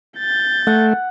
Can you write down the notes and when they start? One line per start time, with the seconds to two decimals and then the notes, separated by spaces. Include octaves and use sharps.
0.18 G6 A6
0.67 A3 F#5